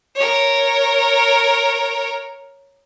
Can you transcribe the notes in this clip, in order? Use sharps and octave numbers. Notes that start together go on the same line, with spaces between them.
A#4 C#5